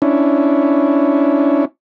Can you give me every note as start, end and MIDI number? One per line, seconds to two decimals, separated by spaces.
0.02 1.65 61
0.02 1.65 62
0.02 1.65 64